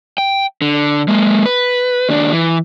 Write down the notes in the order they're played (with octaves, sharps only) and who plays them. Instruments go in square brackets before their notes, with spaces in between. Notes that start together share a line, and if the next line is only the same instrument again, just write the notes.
[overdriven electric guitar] G5
D3
G#3 A#3
B4
D#2 D4
E3